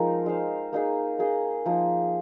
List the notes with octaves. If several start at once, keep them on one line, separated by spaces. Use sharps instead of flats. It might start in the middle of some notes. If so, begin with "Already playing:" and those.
Already playing: F3 G#3 C4 D#4 A#4 F5
G#3 D#4 C5 F5
A#3 D#4 G#4
A#3 G#4 D#5
F3 A#3 D#4